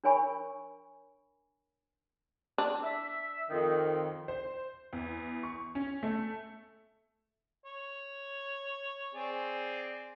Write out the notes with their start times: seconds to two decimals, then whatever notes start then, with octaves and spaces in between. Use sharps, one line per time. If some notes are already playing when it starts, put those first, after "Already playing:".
0.04 D4 A#4 C#5 G#5 B5 C#6
2.58 D4
2.84 E5
3.50 F2 D#3
4.28 C5
4.93 E2
5.43 C#6
5.75 C#4
6.03 A3
7.65 C#5
9.14 C4 G#4 D5